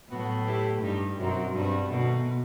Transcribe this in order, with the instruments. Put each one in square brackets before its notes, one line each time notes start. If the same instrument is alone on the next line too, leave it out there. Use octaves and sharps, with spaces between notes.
[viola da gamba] A2 [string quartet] F#3 B3 F#4 B4
[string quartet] A3 E4 G4 B4
[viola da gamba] G2 [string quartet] G3 D#4 G4
[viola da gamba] F#2 [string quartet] B2 F#3 C4 D#4
[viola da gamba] G2 [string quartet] G3 C4 F#4 B4
[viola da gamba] B2 [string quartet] D#3 F#3 A3